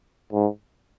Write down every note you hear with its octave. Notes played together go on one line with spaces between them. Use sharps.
G#2